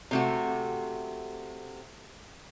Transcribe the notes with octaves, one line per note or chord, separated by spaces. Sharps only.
C3 A3 F#4